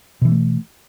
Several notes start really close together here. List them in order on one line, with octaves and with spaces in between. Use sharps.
B2 E3 A#3 A3